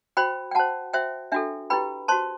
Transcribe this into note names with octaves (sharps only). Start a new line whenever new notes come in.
F#4 C5 G5 B5
G5
F#4 C5 F#5 A5
F#4 C5 E5 G5
D4 F#4 A4 E5 G5
E4 G4 B4 G5 B5
F#4 C5 A5 C6